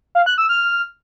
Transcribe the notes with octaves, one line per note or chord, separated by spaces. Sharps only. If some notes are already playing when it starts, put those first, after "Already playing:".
F5
F#6
E6
F6